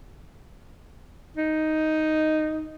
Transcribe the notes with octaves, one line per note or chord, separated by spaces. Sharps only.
D#4